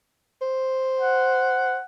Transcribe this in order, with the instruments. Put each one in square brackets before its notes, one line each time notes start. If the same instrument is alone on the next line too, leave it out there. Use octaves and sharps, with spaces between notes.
[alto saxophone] C5
[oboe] F#5